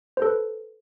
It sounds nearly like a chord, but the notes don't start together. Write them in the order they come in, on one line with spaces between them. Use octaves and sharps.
C5 A4 B4